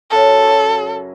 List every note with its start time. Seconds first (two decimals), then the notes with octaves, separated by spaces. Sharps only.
0.11 F#2 C#3 F4 A4
0.42 F#3 E4